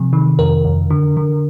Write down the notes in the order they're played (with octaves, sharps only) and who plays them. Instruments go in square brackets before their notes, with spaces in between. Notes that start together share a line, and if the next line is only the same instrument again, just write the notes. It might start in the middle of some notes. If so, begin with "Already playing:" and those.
Already playing: [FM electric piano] C3 F3
D#3
F2 A#4
F2
D3
D3